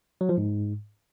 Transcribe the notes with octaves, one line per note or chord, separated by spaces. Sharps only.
F#3
F3
G#2